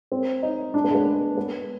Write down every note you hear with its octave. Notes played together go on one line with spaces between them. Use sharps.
C4
D#4
D4
B3
G#3
B3
B3